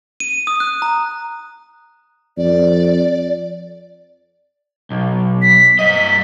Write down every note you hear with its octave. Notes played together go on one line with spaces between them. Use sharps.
D#7
D#6
F#6
A#5
F2 D5
B1
B6
G2 D#5